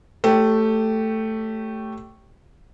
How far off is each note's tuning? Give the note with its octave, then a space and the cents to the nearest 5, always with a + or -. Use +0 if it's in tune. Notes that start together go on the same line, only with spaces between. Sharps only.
A3 +5 G4 -10 C#5 +0